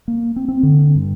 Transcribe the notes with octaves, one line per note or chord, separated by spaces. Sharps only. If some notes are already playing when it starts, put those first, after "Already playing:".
A#3
C4
C4
D3
G2